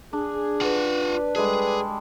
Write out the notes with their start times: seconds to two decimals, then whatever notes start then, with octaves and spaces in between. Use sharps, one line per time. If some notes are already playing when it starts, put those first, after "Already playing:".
0.13 D4 G#4
0.61 F4 B4 F#5
0.99 D5
1.36 G3 G#3 G#4 A4 B4